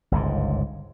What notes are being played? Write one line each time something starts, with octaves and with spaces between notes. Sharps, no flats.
G1 C#2 G#2